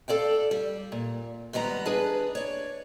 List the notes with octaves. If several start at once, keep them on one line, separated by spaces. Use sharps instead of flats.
A4 D5 F5 G5
G3
A#2
G#2 D#3 G3 B3 A#5
D4 G#4 B4
C#5 D5